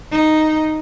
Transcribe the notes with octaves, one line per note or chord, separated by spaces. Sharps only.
D#4